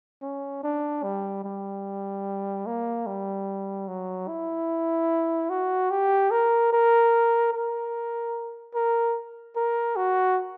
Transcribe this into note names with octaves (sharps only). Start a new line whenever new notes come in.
C#4
D4
G3
G3
A#3
G3
F#3
E4
F#4
G4
A#4
A#4
A#4
A#4
A#4
F#4